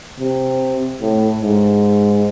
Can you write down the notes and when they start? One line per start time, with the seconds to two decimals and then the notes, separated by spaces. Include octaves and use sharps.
0.20 C3
1.01 A2
1.42 G#2